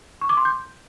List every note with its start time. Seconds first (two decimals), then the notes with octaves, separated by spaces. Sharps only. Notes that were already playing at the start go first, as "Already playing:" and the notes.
0.21 C#6
0.29 D6
0.37 C6
0.45 G6